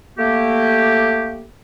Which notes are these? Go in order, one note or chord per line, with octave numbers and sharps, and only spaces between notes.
A3 A#3 G4